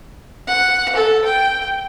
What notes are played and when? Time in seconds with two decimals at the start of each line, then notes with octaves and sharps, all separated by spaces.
0.47 F#5
0.95 A4
1.25 G5